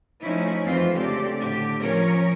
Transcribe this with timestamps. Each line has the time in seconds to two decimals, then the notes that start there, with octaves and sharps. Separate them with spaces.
0.23 F3 A3 C#4 D#4 E4
0.63 F2 E3 G#3 C4 F4 C5
0.92 D2 C#3 C4 G4 A4 D5
1.39 A2 D3 G4
1.82 F3 C#4 A#4 C#5